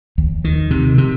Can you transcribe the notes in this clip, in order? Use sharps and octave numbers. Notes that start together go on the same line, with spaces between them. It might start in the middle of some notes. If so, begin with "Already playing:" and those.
D#2
D#3
C3
C3